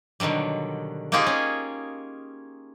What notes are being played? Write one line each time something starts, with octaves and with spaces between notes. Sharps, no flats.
B2 D3 D#3 F#3 G3
A#3 C4 D#4 F4 G4 G#4
C#4